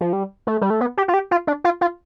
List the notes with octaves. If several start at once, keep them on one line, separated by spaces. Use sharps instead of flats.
F3
G3
A3
G3
A3
B3
G4
F4
G4
F4
D4
F4
F4